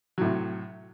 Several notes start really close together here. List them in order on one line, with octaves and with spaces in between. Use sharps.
F#3 A2 C3